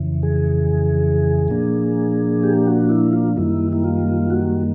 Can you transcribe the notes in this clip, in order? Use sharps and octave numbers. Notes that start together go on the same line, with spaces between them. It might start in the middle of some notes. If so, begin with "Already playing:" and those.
Already playing: F2 C#3 E3
G#4
A#2 F3 A#3 D4
G4
F#4
E4
F4
F#2 D#3 G3 A#3 E4
E4
F4
F#4